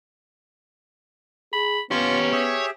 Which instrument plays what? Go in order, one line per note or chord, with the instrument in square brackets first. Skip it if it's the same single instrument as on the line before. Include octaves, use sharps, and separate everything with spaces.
[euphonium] G#4 [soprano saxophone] B5
[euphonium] B3 [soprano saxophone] C#4 [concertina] F4 C#6 [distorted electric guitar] G4 C#5
[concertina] G4 G#4 E5 [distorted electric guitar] C#5